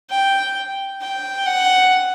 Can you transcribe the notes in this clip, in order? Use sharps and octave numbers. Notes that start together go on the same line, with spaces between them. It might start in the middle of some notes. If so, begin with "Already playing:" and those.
G5
G5
F#5